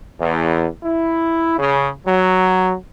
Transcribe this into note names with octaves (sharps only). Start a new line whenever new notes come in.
E2
E4
C#3
F#3